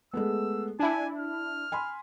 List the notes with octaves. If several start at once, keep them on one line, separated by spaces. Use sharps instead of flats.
G#3 A3 B3 E6
D4 E4 G#5 A5
F6
G#5 B5 C6